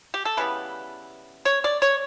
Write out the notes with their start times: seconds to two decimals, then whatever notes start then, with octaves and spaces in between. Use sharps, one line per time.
0.14 G4
0.25 A4
0.37 C#3 E3 G3 B3 B4
1.45 C#5
1.64 D5
1.82 C#5